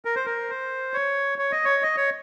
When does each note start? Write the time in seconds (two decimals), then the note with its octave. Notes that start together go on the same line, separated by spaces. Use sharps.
0.05 A#4
0.16 C5
0.26 A#4
0.50 C5
0.94 C#5
1.38 C#5
1.52 D#5
1.65 C#5
1.83 D#5
1.97 C#5